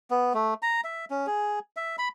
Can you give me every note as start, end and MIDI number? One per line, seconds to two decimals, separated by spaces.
0.10 0.33 59
0.34 0.54 57
0.62 0.81 82
0.84 1.05 76
1.10 1.27 61
1.27 1.59 68
1.77 1.96 76
1.98 2.09 83